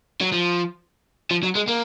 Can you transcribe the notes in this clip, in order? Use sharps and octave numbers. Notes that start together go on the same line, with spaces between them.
F#3
F3
F3
F#3
G#3
A#3